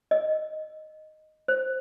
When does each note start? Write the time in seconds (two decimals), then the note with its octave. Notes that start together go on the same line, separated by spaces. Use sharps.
0.11 D#5
1.48 C5